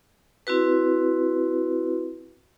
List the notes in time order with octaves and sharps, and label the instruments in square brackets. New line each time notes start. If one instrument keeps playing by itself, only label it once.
[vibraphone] C4 E4 F#4 B4